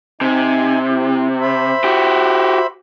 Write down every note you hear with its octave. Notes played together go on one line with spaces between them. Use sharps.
C3 D#4 G#5
C4 E4
C5 E5 B5
F#4 G4